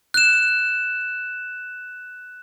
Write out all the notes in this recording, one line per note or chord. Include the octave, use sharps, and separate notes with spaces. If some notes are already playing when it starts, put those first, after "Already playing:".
F#6 E7